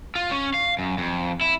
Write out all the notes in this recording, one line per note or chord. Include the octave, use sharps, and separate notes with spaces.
F4
C#4
F5
F#2
F2
E4